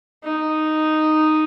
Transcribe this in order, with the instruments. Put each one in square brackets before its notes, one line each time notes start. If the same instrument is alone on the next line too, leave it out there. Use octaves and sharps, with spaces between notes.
[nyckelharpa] D#4